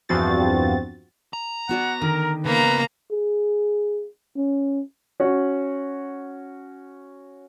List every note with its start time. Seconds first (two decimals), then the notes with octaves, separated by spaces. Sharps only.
0.09 E2 G2 F3 C4 F#4 A6
1.33 A#5
1.69 B3 F#4 D5 F#5
2.01 D3 D#3 A#4
2.45 C#3 A#3 B3 B4 A#5
3.11 G#4
4.36 C#4
5.20 C#4 F#4